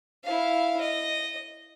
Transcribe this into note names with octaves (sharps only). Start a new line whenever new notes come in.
E4 F5
D#5